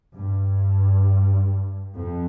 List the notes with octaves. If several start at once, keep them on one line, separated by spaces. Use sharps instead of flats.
G2
F2